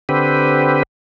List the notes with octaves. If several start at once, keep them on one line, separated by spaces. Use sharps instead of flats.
D3 C4 G4 B4